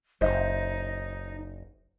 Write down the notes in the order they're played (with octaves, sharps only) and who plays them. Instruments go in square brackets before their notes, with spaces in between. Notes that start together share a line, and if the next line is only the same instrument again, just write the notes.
[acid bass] F#1 [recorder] D#4 [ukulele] C5 D#5 E5